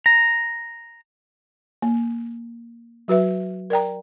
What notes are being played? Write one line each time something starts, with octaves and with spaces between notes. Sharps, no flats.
A#5
A#3
F#3 F#4 B4 E5
A#4 D5 G5 A#5